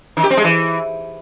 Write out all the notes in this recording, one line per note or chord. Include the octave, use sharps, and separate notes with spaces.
D#3
G4
C4
G#3
E3